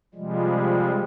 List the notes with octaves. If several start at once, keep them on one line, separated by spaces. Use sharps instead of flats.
C3 F3 G3 G#3